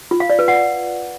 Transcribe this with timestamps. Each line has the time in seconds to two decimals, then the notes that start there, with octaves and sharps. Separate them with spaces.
0.11 F4
0.20 F5
0.30 D5
0.39 B4
0.48 F#5